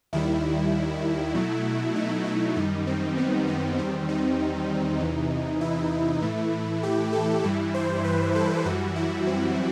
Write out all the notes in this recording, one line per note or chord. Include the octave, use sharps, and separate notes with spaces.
D#2 D#3 G3 E4
B2 F#3 A3
D#4
E4
F#2 D#3 G3 D#4
C4
B3
D#4
E2 D#3 G3 C4
D#4
E2 C3 E3
E4
A2 E3 A3
G4
A4
G2 E3 G3 E4
C5
B4
A4
F#2 E3 G3 F#4
E4
C4